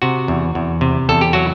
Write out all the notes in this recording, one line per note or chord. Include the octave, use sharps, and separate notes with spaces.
C3 F#4
E2
E2
C3
E2 A4
G4
F#3 F#4